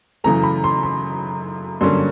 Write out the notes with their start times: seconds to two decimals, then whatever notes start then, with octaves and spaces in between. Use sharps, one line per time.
0.24 F#2 C#3 E3 A3 A#5
0.43 B5
0.64 C6
0.83 C6
1.81 G2 D3 F#3 A#3 C#4 C6